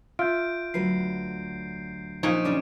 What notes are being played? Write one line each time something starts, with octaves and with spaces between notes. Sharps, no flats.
F4 E5 F5 G6 D7
D2 F#3 B4 C7
A#2 F3 D#4 C#6 G#6 D7
C#3 C#4 D4 D6